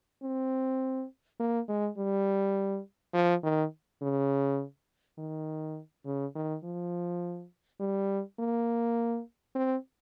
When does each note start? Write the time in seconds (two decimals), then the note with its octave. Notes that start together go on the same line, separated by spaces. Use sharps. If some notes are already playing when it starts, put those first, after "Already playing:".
0.23 C4
1.40 A#3
1.69 G#3
1.98 G3
3.14 F3
3.43 D#3
4.02 C#3
5.18 D#3
6.06 C#3
6.35 D#3
6.64 F3
7.80 G3
8.39 A#3
9.55 C4